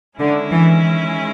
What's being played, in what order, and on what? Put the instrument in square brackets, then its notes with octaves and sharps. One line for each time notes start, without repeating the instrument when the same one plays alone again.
[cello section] D3 [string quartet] D#3 G#3 C#4 E4 G#4
[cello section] E3